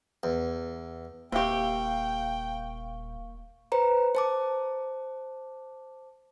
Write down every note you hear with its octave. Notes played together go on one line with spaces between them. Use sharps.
E2
D#1 C3 A#3 G4 F5 G5 C#6
B4 C5 A#5
C5 A5 D6